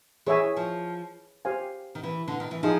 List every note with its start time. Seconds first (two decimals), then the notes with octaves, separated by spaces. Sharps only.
0.26 E3 G#4 C#5 E5 G#5
0.56 F3
1.45 G4 C5 F5 G#5
1.95 D#3
2.03 E3
2.28 D3
2.40 D#3
2.51 E3
2.63 F3 D#4 G#4